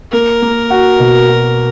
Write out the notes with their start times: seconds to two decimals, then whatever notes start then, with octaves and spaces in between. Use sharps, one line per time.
0.12 A#3 A#4
0.42 A#3
0.70 F#4
0.99 B2
1.28 F#4